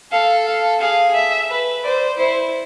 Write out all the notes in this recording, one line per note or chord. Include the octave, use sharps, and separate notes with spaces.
A4 F5
F5
G#4 F5
E5
B4
C5 D5
E4 C5